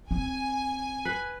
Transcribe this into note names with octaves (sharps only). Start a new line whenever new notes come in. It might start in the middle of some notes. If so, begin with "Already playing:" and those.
C4 G#5
B4